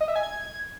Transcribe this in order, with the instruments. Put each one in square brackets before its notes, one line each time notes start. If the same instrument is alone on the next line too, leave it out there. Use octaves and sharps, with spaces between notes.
[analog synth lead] D#5
E5
G#5
G#6